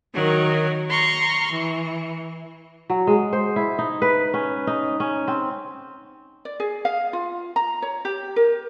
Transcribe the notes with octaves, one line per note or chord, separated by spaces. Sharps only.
D#3 F#3 A#4
A#5 C6 C#6 F6
E3
F#3
G#3
C5
E4
D#4
B4
C#4
D#4
C#4
C4
D5
G#4
F5
F4
A#5
C#5
G4
A#4